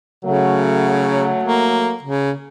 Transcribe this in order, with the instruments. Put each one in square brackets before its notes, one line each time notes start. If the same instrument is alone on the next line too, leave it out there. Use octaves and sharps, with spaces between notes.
[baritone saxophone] C#3 [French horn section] F#3 A3
[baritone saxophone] A#3
C#3